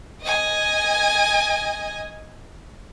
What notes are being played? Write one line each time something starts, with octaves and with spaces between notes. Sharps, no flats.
D#5 G#5